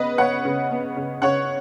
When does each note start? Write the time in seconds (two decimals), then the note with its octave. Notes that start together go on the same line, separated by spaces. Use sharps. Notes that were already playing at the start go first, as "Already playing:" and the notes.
Already playing: C#3 B3 B4 D#5
0.18 B3 C#5 F#5
0.45 C#3
0.71 B3
0.96 C#3
1.22 C#3 C#5 F#5